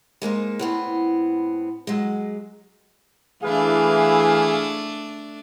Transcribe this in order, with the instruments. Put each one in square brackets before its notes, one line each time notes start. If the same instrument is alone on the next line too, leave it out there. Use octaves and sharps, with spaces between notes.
[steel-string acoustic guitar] G#3 A#3 D#4 C5
A2 B3 C4
F#3 G#3
[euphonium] E3 [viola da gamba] A3 D4 [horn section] E4 B4 F5 [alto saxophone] G#4